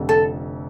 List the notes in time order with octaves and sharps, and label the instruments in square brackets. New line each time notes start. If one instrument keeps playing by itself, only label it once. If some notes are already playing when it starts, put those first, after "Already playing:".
Already playing: [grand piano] F1 F2 D3
[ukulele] A4